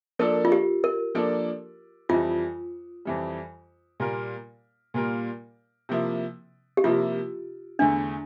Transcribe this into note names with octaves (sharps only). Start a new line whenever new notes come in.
F3 A#3 D4 A4 A#4 D5
F4
G4
A#4
F3 A#3 D4 A4 D5
F2 E3 G3 F4
F2 E3 G3
A#2 G3 A#3 F4 A#4
A#2 G3 A#3 F4 A#4
C3 F3 A#3 E4
G4
C3 F3 A#3 E4 F4
E2 D3 A3 D4 E4